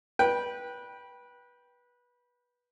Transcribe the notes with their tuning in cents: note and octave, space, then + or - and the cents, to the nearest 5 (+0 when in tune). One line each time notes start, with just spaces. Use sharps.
B4 -20 G5 +0